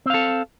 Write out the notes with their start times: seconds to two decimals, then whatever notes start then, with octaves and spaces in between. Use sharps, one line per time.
0.06 C4
0.10 F5
0.14 A4